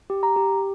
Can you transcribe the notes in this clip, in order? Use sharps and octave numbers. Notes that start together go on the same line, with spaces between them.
G4
A#5
G4